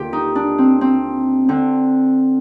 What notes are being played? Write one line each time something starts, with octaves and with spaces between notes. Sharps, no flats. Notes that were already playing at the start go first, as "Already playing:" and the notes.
Already playing: D#2 D3 F4 G4
D#4
D4
C4
C4
D3 C4